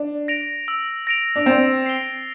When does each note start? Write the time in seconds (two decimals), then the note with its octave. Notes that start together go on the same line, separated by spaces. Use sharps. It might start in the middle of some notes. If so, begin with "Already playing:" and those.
Already playing: D4
0.28 A#6 D7 F7
0.68 E6
1.07 A#6 D7 F7
1.36 D4
1.46 C4 A6
1.86 C7 G7